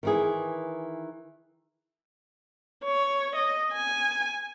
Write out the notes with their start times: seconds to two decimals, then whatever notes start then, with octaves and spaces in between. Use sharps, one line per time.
0.03 D#3 E3 G#4
2.85 C#5
3.35 D#5
3.73 G#5